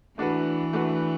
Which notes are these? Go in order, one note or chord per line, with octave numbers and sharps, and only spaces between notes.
E3 A3 D4 F#4 B4
A3 D4 F#4 B4